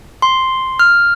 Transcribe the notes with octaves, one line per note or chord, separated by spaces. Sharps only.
C6
F6